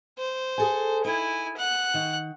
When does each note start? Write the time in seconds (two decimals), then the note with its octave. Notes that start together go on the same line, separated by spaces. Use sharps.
0.18 C5
0.58 G#4 A4 G#5
1.05 D#4 E4 G#5
1.57 F#5 F#6
1.94 D#3